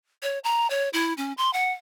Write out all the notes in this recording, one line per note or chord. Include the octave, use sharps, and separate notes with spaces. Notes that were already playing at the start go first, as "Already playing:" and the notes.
C#5
A#5
C#5
E4
C#4
C6
F#5